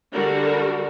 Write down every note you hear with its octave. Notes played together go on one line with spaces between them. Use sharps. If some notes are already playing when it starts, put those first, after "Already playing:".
D3 G3 D4 F#4 A#4